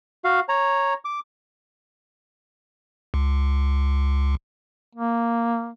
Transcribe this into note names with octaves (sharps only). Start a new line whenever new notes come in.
F#4 F5
C#5 A#5
D6
C#2
A#3